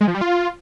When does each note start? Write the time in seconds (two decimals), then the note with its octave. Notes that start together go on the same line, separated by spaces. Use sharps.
0.01 G#3
0.08 F3
0.14 G3
0.21 F4